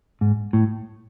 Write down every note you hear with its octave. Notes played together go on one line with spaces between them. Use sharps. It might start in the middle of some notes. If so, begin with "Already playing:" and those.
G#2
A2